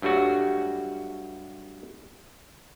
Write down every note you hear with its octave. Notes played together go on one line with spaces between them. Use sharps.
G2 F#3 G3 A3 F#4